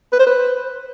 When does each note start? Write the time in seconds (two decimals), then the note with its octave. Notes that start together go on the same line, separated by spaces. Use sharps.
0.12 B4
0.19 C5
0.26 B4